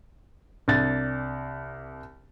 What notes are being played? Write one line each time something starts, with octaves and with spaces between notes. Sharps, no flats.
C2 D4 A6